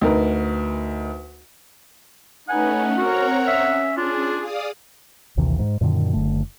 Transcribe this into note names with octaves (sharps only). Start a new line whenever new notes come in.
D2 D#4 A#4 B4
A3 C#4 D#4 B4 F#5 G#5
C4 F#4 A#4 C#5 A#5
C#4 E5
D4 F4 G#4
G#4 D5 F5 D#6
A#1 D#2 C3 E3
G#2
F#2 A#2 D3 D#3
F#1 D3 A3